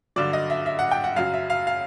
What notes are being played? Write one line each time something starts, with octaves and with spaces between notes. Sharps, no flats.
G2 D3 F#3 D5
D#5
E5
E5
F#5
G5
F#5
F#2 C#3 F#3 F5
E5
F5
F5